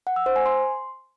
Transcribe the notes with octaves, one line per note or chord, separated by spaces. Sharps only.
F#5
E6
C5
G#5
C6